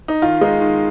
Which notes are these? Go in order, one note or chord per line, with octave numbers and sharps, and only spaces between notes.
D#4
D#3 F4
G#3 D#4
D#3